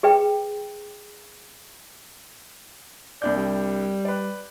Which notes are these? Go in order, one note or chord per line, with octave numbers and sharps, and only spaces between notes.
G#4 B4 G5
C2 D4 D5 G6
G3
B4 D5